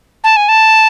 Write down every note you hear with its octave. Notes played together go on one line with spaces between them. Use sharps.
A5
G#5
A5